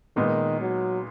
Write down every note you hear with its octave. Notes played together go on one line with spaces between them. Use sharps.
A#2 D#3 G#3 B3 D#4
F#3